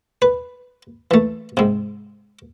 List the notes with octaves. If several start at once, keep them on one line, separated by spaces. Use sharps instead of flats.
B4
E3 A3
G#2 C3